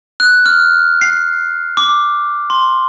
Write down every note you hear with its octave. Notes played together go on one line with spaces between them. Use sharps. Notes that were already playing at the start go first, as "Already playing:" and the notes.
F#6
F6
C7
D6
C6